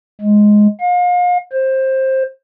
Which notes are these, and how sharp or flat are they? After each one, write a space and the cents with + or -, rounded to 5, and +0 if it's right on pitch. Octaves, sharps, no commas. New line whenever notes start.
G#3 +5
F5 +40
C5 +15